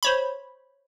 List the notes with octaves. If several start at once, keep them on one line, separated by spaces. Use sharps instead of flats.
C5 C#5 B5